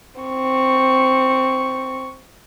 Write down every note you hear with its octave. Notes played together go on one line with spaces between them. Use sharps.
C4 C#6